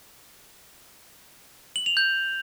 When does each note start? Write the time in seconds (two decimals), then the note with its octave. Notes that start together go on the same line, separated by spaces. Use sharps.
1.76 F#7
1.86 F7
1.97 G6